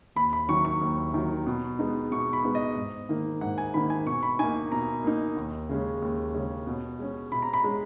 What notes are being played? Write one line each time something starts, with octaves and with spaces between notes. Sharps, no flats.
D#2 B5
B5
D#3 F#3 C#6
C#6
D#2
D#3 F#3
B2
G#3 B3 D#4
B2 C#6
B5
G#3 B3 D#4
D#5
G#2
D#3 A#3 D#4
G#2 F#5
G#5
D#3 A#3 D#4 B5
G#5
B2 C#6
B5
A#3 D#4 G#5
B2 A#5
A#3 D#4
D#2
C#3 G#3 C#4
D#2
C#3 G#3 C#4
B2
G#3 C#4
B2 B5
A#5
B5
G#3 C#4